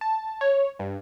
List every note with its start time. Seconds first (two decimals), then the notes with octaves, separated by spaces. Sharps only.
0.01 A5
0.41 C#5
0.79 G2